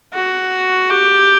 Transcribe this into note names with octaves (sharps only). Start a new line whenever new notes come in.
F#4
G4